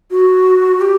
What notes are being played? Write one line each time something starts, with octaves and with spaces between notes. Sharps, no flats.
F#4
G4